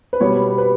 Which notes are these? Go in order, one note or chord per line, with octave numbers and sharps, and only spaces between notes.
B4
B2 G3 B3 C#5
B4